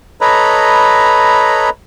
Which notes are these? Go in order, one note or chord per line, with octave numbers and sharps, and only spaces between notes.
A4 B4 C#5 D#5 A#5 B5